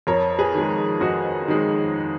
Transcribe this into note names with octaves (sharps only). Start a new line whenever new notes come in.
F2 A#4 C#5
G#4 B4
D#3 G#3
F2 D#4 F#4
D#3 G#3